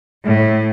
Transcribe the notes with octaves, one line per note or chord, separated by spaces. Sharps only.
A2